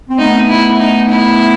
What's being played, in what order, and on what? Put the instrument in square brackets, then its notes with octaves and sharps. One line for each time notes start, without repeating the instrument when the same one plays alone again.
[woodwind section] C4
[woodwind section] A3 B3 [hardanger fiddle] D#4
[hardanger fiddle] E4
D#4
E4